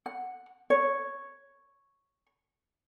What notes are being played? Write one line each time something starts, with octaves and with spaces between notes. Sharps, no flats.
F#5
C#5